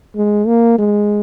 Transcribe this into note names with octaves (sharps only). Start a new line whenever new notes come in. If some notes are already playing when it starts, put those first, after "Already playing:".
G#3
A#3
G#3